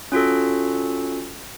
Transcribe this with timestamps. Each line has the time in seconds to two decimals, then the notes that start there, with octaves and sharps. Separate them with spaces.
0.12 C#4 F4 F#4 A4